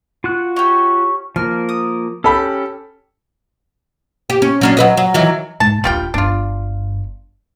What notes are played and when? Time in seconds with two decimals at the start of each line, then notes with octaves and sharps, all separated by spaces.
0.24 F4 F#4 F#6
0.56 C#4 G4
1.36 F3 A#3 A#4 F6
1.69 D#6
2.24 C#4 G4 A4 B5
4.30 G4
4.42 C#4
4.61 F#3 C#4 D4
4.77 F#3 B4 D#5
4.97 F#3
5.14 D#3 E3 F#3
5.60 G#2 A5
5.84 D#1 G3 D4 F4 G5
6.14 G1 G2 D4 F4